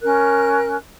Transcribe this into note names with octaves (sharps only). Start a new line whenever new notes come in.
C#4 A#4 F#6